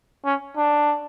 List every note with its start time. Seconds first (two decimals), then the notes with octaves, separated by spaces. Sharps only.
0.25 C#4
0.57 D4